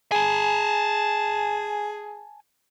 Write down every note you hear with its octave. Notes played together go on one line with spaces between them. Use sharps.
G#4 G#5 A5